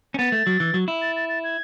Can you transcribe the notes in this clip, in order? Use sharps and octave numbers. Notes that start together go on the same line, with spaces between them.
C#4
B3 A6
A3
F#3
E3
F#3
E4
A6
A6
A6
G#6